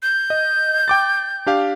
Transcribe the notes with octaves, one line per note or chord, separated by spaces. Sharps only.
G6
D#5
G5 D6 A6
D4 G4 F5